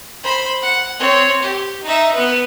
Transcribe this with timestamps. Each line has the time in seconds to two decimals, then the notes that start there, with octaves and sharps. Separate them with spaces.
0.23 C5 B5
0.62 F#5
0.99 C4 C#5
1.43 G4
1.84 D#4 E5
2.13 B3 B4